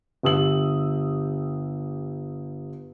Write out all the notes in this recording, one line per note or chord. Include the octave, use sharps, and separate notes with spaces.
G1 G4 D#6 E6 F#7